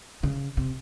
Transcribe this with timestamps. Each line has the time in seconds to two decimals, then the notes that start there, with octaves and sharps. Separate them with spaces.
0.23 C#3
0.57 C3